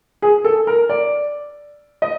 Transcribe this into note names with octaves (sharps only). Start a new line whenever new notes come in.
G#4
A4
A#4
D5
D#5